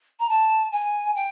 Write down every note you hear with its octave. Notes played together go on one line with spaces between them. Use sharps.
A#5
A5
G#5
G5